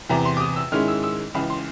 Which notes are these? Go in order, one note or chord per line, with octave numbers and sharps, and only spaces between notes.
E2 C3 E3 A#5
C6
D6
D#6
E6
G#2 D#3 G#3 C#4 E4 F6
E6
E6
C#2 C#3 E3 B5
C6